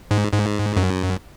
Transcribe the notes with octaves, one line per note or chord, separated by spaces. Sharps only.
G#2
G#2
F#2